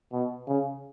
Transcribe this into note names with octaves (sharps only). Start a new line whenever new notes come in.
B2
C#3